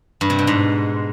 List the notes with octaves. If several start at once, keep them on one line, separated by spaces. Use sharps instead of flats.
G2
C3
B2
G#2